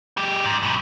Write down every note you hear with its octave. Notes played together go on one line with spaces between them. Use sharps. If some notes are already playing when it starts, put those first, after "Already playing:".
G#3 G4
G#2
F#2 B2